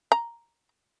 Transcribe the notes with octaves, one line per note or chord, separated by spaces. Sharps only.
A#5